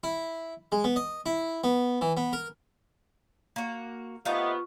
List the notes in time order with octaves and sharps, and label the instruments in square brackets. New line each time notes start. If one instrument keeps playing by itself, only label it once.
[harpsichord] E4
G#3
B3
D#5
E4
B3
E3
B3
A#4
[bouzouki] A#3 F#4
[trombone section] C3 B3 [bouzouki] A3 D#4 F5 [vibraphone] F4 C#6